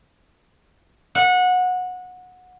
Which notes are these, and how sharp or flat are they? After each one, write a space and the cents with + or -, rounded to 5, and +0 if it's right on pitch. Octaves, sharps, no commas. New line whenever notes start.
F#5 -20